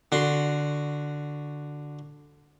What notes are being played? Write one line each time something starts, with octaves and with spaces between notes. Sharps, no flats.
D3 F#4 C6